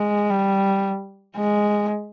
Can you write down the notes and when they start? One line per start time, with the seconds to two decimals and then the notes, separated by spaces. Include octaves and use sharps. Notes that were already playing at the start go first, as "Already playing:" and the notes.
Already playing: G#3
0.30 G3
1.37 G#3